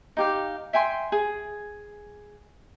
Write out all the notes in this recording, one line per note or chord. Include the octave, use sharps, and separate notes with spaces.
D#4 G4 F5
E5 G5 G#5 C6
G#4